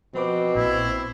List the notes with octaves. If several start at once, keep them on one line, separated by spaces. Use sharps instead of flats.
B2 F3 C4 B4 D6
A#1 A#2 E4